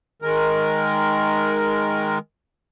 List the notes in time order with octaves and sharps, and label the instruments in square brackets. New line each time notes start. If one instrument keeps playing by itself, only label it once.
[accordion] D#3 G#3 A#4